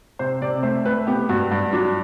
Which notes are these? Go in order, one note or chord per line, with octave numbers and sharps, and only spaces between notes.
C3 C5
C3 D5
A3 C5
A3 B4
B3 G4
G2 F#4
G2
F#3 D4